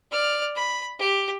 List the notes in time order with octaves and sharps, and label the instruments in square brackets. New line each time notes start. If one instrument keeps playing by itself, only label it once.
[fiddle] D5 F6
B5
G4